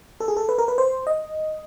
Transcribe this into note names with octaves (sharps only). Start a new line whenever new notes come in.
A4
G#4
A4
B4
A#4
B4
C5
D#5